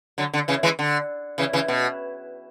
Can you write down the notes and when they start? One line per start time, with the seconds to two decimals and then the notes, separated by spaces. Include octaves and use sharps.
0.18 D3 F#3
0.33 D3
0.48 C#3 E3
0.63 E3 G#3
0.79 D3
1.38 C#3 E3
1.53 C#3 E3
1.68 B2